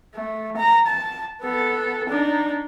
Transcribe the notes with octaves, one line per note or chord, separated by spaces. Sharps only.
A3
A#5
A5
B3 A4
D4 D#4